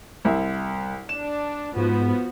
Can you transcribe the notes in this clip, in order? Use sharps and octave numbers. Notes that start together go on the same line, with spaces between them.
C2 E5
D4 E7
G#2 F3 B3 F#4